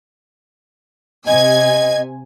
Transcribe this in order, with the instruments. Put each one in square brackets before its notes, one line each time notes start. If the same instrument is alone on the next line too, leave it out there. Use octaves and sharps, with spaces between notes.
[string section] C3 G#5 G#6 [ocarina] D#5